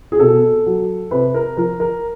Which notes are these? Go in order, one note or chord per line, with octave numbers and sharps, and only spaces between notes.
G#4
B2 A4
F#3
C3 B4
A#4
F3 A#4
A#4